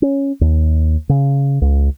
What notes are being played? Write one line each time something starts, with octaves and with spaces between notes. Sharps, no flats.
C#4
D#2
C#3
C#2